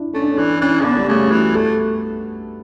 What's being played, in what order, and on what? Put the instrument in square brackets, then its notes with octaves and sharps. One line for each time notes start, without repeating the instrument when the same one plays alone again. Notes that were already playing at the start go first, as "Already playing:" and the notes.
Already playing: [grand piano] D4 E4
[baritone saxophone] A3 [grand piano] C#4
[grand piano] D4
C#4
[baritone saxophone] E3 [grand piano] D4
[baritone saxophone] E3 [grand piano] C#4
[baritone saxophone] C#3
[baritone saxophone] D3 [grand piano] B3
[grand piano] G3
[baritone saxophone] C#3 [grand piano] A3
[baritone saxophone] E3 [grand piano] F#4
[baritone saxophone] A3 [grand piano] A4